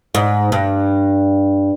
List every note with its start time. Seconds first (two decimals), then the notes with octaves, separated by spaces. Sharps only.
0.15 G#2
0.52 G2